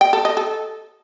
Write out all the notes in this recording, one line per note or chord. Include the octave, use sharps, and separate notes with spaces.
G5
A4
D#5
A4